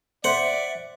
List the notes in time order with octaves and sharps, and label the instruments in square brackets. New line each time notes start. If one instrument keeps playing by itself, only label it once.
[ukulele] C5 [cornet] D5 [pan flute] E5 [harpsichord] F#5